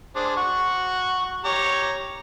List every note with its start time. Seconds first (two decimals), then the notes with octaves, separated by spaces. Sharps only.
0.16 D4 G#4 C5
0.37 F#5 C#6
1.45 G4 C#5 A#5